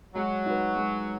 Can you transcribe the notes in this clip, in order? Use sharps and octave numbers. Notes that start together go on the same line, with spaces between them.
F#3 G#3
D#4 F#4 B4
G#3